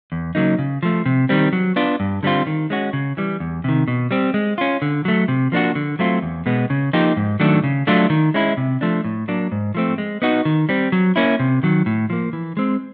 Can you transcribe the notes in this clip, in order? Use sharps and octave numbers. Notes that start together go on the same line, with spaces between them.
E2
C#3 F#3 A#3 D#4
C#3
F3 A3
C3
D#3 G3 C4
F#3
B3 D4 F4
G2
D3 G3 C4 F4
D#3
G#3 C#4 F#4
C#3
E3 G3
E2
C3 D#3
B2
G3 C4
G#3
C#4 F4
D3
F#3 A3
C3
F3 A#3 D4 F#4
D3
F#3 A3 C4 F4
E2
B2 G#3 B3
C#3
F3 A#3 D#4 G4
G#2
D#3 F#3 A3 D4
C#3
F#3 A3 D4 F4
D#3
G#3 C#4 E4
C3
F3 A3 D4
A2
F#3 A#3 D4
G#2
F3 A3 C4
G#3
B3 D#4 F#4
D#3
G3 C4
F#3
A#3 C#4 E4
C3
D#3 F#3
A2
F3 A#3
E3
G#3 C4